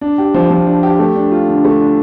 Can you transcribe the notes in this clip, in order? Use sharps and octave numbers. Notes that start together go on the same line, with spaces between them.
D4
G4
F3
F3
D4
G4
A3
D4
F4
D3
A3
D4